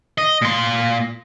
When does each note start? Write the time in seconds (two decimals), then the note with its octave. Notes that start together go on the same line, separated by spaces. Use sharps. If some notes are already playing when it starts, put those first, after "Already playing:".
0.18 D#5
0.42 A#2 C6